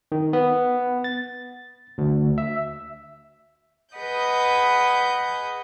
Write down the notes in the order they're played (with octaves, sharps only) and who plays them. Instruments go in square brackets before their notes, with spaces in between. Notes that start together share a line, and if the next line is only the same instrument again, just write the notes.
[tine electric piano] D#3
B3
A6
D2
E5
[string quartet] G#4 B4 D#5 F#5 G6